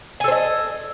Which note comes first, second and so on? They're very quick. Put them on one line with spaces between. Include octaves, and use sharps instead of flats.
G#5 A4 C5 D#5